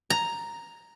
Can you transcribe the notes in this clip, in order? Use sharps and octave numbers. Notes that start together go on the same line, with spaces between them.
A#5